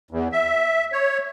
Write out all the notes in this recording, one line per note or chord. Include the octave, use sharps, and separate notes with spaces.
E2
E5
C#5